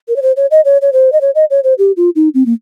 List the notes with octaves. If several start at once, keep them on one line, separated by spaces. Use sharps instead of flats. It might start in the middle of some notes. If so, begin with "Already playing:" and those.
A#4
C#5
C5
C#5
D#5
C#5
C#5
C5
D#5
C#5
D#5
C#5
C5
G4
F4
D#4
C4
A#3